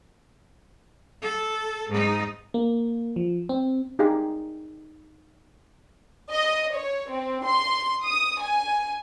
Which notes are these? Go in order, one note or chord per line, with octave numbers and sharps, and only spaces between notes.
A4
G#2 D#4
A#3
F3
C4
D#4 G4 G#4 F5 C6
D#5
C#5
C4
C6
D#6
G#5